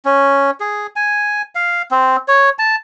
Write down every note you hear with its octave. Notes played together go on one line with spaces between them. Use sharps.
C#4
G#4
G#5
F5
C4
C#5
A5